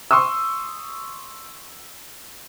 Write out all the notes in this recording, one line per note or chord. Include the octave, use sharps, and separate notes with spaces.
C6 C#6 D#6 E6